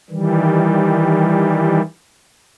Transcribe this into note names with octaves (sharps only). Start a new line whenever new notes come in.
D#3 E3 G3